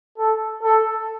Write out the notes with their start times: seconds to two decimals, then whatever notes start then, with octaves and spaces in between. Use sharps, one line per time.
0.18 A4
0.63 A4